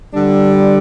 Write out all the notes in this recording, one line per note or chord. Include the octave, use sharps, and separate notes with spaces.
D3 G3 D4